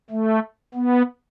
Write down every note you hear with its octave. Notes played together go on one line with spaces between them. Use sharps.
A3
B3